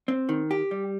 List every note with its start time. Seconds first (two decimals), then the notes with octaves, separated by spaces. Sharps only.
0.08 C4
0.29 D#3
0.51 G4
0.71 G3